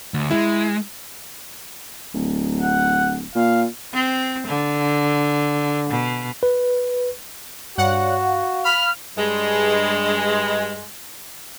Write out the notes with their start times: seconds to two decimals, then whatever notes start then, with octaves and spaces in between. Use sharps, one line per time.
0.14 D2
0.31 G#3 E4
2.14 D1
2.62 F#5
3.35 A#2 F5
3.94 C4
4.47 D3
5.90 B2
6.43 B4
7.78 G2 F#4 C#5 D5 F5 F#5
8.21 F5
8.65 B5 F6
9.17 G2 G#3